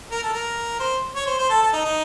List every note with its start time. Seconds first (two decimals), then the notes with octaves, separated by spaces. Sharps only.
0.11 A#4
0.23 A4
0.33 A#4
0.80 C5
1.16 C#5
1.27 C5
1.39 C5
1.50 A4
1.62 A4
1.73 D#4
1.85 D#4